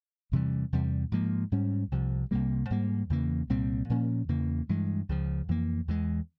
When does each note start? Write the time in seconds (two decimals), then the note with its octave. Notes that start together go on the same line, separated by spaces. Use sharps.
0.32 E2 C3 E3 G3
0.73 E2 C3 G3
1.12 G#2 F3 A#3
1.52 G#2 G3 C#4
1.92 C2 C3 F3
2.31 C2 C3 G3 A#3
2.70 G#2 G3 A#3
3.10 E2 C#3 E3 A#3
3.50 C2 A#2 G3 C4
3.90 A#2 F3 A#3 C#4
4.29 E2 C#3 E3 A#3
4.69 G2 E3 G#3
5.09 C#2 C#3 F3
5.49 F2 E3 A#3
5.88 E2 E3 G#3